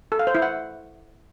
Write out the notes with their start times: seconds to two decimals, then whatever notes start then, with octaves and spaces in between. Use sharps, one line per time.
0.12 A4
0.19 F5
0.27 C5
0.35 E4
0.42 F#5